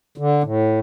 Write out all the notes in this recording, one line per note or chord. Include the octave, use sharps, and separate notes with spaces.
D3
A2